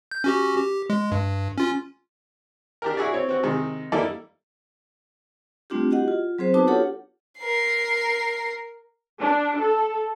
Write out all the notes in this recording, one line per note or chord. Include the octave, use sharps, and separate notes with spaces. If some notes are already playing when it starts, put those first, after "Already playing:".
G6
C#4 F#4 G4
G4
G#3
G2
C#4 F4
D4 G4 A#4
E4 F#4 G#4 D5
C4 C#5
C4 F#4
C3 D#3 G#3
G3 A#3 D#4 E4 A4 D5
G3 A3 C4 D4 F4 G4
E4 F#4 G4 D#5 F#5
F4
F#3 C4 G#4 C5
B3 D#4 F#4 B4 A5 D6
D4 F4 G4 A4 C#5 F#5
A#4 C7
D4
A4